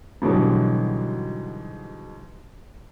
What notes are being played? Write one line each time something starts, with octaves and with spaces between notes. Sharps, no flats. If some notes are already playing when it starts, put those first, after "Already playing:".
G#2 B2 D3 E3 F#3 G3